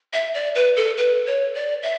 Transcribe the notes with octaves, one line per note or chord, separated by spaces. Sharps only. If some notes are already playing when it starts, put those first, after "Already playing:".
E5
D5
B4
A4
B4
C#5
D5
E5